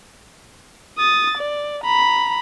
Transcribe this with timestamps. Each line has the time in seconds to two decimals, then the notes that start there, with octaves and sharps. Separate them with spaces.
0.98 D#6 A6
1.38 D5
1.84 A#5 B5